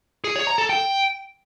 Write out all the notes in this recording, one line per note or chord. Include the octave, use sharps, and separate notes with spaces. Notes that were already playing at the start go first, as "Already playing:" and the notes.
G#4
C#5
A#5
A4
G5